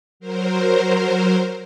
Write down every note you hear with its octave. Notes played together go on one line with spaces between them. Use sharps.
F#3 A#4 C5